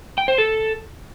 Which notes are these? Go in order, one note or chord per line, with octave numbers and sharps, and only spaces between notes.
G5
C5
A4